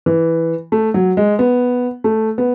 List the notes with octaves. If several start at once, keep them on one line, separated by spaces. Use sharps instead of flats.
E3
A3
F#3
G#3
B3
A3
B3